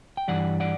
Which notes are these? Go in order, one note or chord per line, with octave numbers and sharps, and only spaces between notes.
G5
G2 E3 G3 D5 F#5
D5 F#5